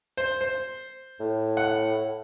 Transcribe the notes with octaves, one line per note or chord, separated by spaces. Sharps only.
C5
C5
A2
F#5